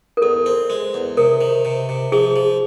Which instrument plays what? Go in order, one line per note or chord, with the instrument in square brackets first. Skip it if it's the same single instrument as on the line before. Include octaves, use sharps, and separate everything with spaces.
[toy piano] A#4
[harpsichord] E2 [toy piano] A4
[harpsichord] C4
G#3
E2
[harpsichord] C3 [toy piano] A#4
[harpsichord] D#3
C3
C3
[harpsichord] F3 [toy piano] G#4
[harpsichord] F3